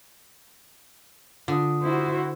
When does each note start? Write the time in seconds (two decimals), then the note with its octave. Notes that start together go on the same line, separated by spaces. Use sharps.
1.48 D3 F4 D#6
1.82 E4 F#4 C5